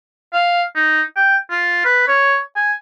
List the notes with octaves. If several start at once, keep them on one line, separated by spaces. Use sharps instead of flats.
F5
D#4
G5
F4
B4
C#5
G#5